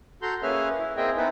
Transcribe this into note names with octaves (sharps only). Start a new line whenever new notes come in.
F#4 A4 A#5 C6 G6
A#3 C#4 G#4 B4 E5 F6
E4
A#3 C4 G#4 D#5 E5 G5
B3 C4 D#4 E4 B4